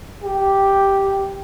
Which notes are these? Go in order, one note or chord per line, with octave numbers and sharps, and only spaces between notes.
G4